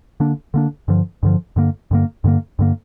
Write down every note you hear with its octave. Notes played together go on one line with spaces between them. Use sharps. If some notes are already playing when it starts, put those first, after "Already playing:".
D3 A#3 D4
D3 A#3 D4
G2 D3 F3
G2 D3 F3
G2 D3 A#3
G2 D3 A#3
G2 D3 A#3
G2 D3 A#3